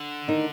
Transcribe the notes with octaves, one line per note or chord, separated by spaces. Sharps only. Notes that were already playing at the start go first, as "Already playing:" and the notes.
Already playing: D3
D#3 D#4